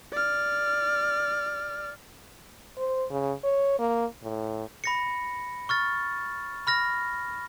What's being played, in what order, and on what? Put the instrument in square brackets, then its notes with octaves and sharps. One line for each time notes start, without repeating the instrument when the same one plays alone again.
[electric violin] D5 F6
[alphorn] C5
C#3
C#5
A#3
A2
[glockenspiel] B5 A#6 C#7
C#6 F6 A6
B5 F6 A#6